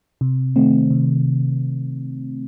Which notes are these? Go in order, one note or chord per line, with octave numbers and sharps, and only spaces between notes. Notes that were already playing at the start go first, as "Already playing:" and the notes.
C3
D#3 A3 C4
C3